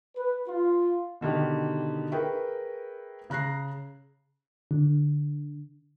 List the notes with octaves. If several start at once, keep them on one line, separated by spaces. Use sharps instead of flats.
B4
F4
B2 D3 D#3 G4
G#4 A#4 B4 E5 G5 C#6
C#3 A#5 F#6 A#6 C7
D3